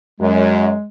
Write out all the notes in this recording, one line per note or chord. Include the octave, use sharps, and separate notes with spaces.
F#2 G#3